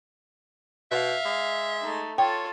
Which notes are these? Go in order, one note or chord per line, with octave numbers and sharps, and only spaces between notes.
B2 E5 F5
G#3
A3 D#4
F4 A4 C#5 G5